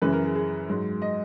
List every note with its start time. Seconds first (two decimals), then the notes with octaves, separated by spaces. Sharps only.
0.02 F#2 C#3 E3 B4
0.13 A#4
0.24 G#4
0.35 G#4
0.69 G#2 F#3
1.02 D#5